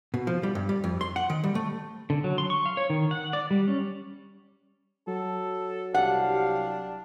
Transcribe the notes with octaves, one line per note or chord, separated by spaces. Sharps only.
B2
F3
G3
G2
G3
F2
C6
F#5
D#3
G3
A3
D3
F#3
C6
C#6
F5
C#5
D#3
F#5
D5
G3
C#4
F#3 A4
C2 D4 G4 F5 F#5